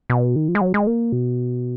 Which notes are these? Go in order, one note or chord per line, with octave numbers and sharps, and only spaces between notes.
B2
D#3
F3
G#3
F#3
G#3
A#3
B2